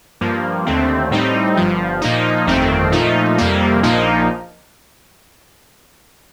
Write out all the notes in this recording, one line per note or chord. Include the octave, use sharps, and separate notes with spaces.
G2 F3 A#3
D#2 D3 A3 C4
A2 G3 C4 D#4
G1 G2 F3
A#2 F3 A#3 D#4
G1 F2 D#3 A3 C4
A#2 F3 A3 D#4
F2 C3 G3 A#3
A#1 A#2 F3 A#3 D#4